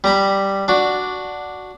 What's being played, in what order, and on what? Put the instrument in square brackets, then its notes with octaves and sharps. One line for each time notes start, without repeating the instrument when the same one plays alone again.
[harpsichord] G3 A#5 B5
D4 F#4